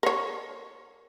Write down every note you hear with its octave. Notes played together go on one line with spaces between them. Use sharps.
A#4 C#5